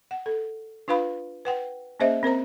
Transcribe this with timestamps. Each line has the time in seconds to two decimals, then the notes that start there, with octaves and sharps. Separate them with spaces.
0.11 F#5
0.26 A4
0.88 D4 F4 B4 F5 B5
1.45 B4 F#5 G5
2.00 A#3 C#4 G#4 C5 D#5 E5
2.23 C4 A#4 C5 A#5